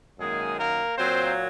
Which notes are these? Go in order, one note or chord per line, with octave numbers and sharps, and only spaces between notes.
F#2 D#3 G#3 A#3 G#4
A#3 A#4
A#2 F#3 A#3 C4 C5